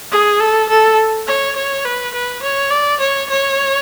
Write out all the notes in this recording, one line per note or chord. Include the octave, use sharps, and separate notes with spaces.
G#4
A4
A4
C#5
C#5
B4
B4
C#5
D5
C#5
C#5